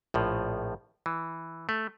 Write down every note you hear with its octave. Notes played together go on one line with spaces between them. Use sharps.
A#1 A2 F3
E3
A3